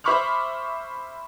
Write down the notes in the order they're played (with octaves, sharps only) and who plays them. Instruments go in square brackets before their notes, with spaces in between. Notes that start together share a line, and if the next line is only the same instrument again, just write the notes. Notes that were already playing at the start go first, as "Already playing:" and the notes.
[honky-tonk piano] C5 E5 B5 C#6 D6 F6